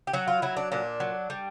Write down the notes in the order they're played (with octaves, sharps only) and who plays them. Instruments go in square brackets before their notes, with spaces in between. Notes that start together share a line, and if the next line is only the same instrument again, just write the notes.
[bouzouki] G4
F#3 F#4
F4
F#3 E4
D4
A#2 D4
F#3
G3